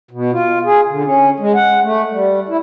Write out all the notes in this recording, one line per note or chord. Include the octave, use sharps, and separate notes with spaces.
B2
F4
G#4
D3
C#4
G#3
F#5
A3
G3
E4